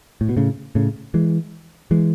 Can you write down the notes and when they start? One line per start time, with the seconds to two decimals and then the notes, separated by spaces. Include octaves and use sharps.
0.21 A2
0.29 B2
0.37 A2 C#3
0.75 A2 C#3
1.14 E3 G#3
1.91 E3 G#3